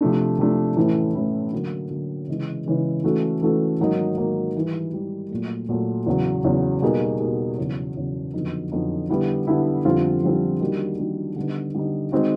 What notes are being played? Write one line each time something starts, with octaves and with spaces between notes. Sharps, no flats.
C3 F3 A3 D4
C3 F3 A3 D4
A2 E3 A3 C#4 E4
A2 E3 A3 C#4 E4
D3 F#3 A#3
D3 F#3 A#3
C#3 E3 G#3
C#3 E3 G#3
E3 A3 C#4 F#4 A4
E3 A3 C#4 F#4 A4
G#2 D#3 F#3 A#3 D#4
G#2 D#3 F#3 A#3 D#4
G#2 E3 G3
G#2 E3 G3
A#2 F#3 A3
A#2 F#3 A3
E2 C#3 F#3
E2 C#3 F#3
B2 G3 A#3 D#4 G#4
B2 G3 A#3 D#4 G#4
E2 C#3 F#3
E2 C#3 F#3
F2 D3 F#3 B3 D#4
F2 D3 F#3 B3 D#4
D3 G3 B3 E4
D3 G3 B3 E4
F2 D3 G3 C4 F4
F2 D3 G3 C4 F4
D#3 G3 A#3 D4 F#4
D#3 G3 A#3 D4 F#4
D3 G3 B3 D#4
D3 G3 B3 D#4
D#3 G#3 C4 D#4 F#4